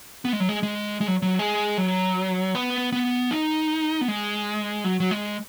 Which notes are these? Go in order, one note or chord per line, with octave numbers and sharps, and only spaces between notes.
B3
G#3
F#3
G#3
G#3
G#3
F#3
F#3
G#3
F#3
B3
B3
D#4
B3
G#3
F#3
F#3
G#3